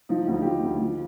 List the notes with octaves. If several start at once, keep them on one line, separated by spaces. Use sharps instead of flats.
F3 D#4
D#4
D2
D#4
G4
D2 F4
D2
F3